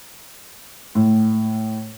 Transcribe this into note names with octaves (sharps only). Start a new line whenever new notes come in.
A2